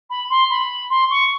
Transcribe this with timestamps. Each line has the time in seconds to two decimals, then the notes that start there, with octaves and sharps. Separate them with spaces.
0.10 B5
0.30 C6
0.50 B5
0.90 C6
1.10 C#6